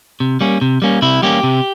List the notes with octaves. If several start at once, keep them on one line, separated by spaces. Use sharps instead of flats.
C3
G3 A#3 C#4
C3
G3 A#3 C#4
C3 E4
G3 A#3 C#4 G4
C3